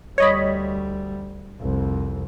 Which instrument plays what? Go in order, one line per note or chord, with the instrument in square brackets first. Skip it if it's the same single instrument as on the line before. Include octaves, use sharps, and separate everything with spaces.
[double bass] D2 G3 [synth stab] C#5 D#5 B5
[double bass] C2 F2